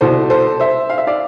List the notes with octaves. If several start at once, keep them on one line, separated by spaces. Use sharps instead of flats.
C2 B2 A4 C5
A4 C5
C5 E5
F5
E5
D5 F5